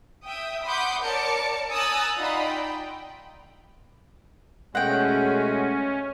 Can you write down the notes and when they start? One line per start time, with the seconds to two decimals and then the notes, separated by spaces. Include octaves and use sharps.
0.23 E5 G5 D#6
0.64 F#5 B5 C6 D6 D#6 G6
1.04 A#4 C#5 D5 A5 D6 C#7
1.71 G#5 A#5 D#6 E6 F#6 A6
2.17 D#4 F4 D5 D#5 F#5 B5
2.46 G5
4.75 B2 G#3 A3 C#4 F#5 G5